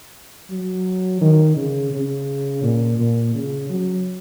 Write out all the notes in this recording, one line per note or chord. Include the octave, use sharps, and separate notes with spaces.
F#3
D#3
C#3
C#3
A#2
A#2
C#3
F#3